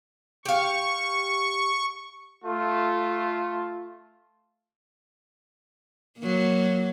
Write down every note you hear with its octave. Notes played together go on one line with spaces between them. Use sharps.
G4 F5 C#6
A3 F4
F#3 A#3